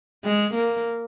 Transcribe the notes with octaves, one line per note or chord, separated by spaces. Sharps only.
G#3
A#3